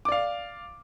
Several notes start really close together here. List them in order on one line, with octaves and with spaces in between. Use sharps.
D6 D5 F5